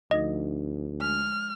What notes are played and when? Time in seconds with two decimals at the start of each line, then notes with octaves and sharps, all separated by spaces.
0.11 D2 F3 D4 D#4 D#5
1.01 G#3 F6